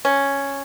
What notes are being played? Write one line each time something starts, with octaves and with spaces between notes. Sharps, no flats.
C#4